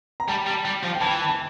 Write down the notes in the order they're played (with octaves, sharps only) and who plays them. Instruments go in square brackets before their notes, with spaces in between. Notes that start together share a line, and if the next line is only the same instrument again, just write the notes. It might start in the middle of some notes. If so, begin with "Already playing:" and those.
[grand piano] A#5
[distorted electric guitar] G3 [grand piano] A5
[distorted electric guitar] G3
G3
F3
[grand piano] G5
[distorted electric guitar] E3 [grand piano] A5
[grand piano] A5